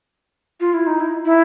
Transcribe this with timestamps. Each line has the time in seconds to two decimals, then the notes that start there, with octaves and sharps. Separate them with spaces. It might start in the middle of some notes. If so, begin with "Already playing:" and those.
0.60 F4
0.74 E4
0.87 D#4
1.00 E4
1.25 E4